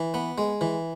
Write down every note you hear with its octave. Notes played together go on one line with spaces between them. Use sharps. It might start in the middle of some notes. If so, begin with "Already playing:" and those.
Already playing: E3
B3
G#3
E3